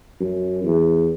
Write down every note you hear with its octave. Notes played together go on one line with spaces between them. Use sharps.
F#2
E2